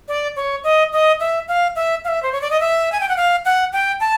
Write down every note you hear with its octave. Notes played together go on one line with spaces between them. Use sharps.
D5
C#5
D#5
D#5
E5
F5
E5
F5
E5
C5
C#5
D5
D#5
E5
G#5
G5
F#5
F5
F#5
G5
A5